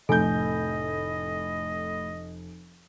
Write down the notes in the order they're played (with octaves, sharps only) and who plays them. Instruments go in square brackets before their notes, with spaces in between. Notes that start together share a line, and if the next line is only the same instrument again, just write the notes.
[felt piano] F1 [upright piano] A2 G6 [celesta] A4 G#5 [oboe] D#5